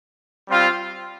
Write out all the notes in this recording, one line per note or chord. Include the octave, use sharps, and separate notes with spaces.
G3 C4 F4